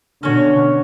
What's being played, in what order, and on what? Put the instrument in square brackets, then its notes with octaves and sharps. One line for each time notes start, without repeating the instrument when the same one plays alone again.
[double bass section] B2 D3 [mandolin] C#4 F#4 C#5